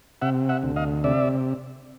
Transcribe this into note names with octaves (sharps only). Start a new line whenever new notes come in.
C3 E5 F#5
E5 F#5
D2
D#5 F5
C3 D5 E5